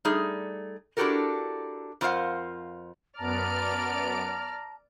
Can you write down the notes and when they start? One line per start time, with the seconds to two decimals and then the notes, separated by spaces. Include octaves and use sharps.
0.05 G3 A3 D#4 G#4
0.97 D4 E4 F#4 G4 A4 A#4
2.01 F2 F4 A#4 C5 F5 F#5
3.19 F#2 B3 D5 A5 A#5 F6 D7